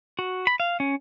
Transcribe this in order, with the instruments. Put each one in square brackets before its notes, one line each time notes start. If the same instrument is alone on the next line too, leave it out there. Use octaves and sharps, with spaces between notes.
[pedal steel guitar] F#4
B5
F5
C#4